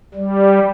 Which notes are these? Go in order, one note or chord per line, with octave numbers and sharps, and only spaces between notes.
G3